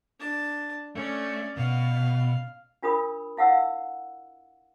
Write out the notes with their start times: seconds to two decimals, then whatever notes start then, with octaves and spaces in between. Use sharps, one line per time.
0.20 D4 A5
0.95 A3 C#4 D5
1.57 B2 F5
2.82 D4 F4 A#4 B5 D#6
3.37 E4 F5 F#5 E6